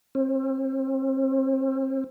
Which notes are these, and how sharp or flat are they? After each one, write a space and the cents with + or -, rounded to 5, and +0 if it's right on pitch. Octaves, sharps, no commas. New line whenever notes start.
C4 +35